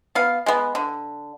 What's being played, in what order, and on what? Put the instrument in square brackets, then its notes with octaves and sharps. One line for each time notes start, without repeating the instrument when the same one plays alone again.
[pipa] B3 F5
G#3 B3
D3